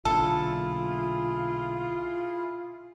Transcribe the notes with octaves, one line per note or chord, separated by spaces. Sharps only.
B1 A#2 D3 E4 F4 G#4 A4